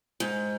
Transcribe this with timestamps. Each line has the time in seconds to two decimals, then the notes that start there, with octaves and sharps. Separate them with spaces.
0.20 G#2